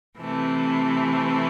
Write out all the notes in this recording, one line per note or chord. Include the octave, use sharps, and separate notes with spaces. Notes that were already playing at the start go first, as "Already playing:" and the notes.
C3 E3 A3